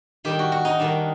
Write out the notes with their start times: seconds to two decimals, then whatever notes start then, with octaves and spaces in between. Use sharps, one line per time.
0.25 D#3 G3 D4 G4
0.39 F#4
0.52 F#4
0.65 D#4
0.79 D#3 G3 D4